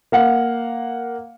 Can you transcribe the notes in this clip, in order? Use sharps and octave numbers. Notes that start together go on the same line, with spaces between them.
A#3 F5 F#5